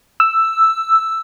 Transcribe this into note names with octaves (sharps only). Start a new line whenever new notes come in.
E6